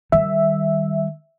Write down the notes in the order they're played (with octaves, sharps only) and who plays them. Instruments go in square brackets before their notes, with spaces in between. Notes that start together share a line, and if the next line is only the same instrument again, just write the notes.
[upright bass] D#3 G3 [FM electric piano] E5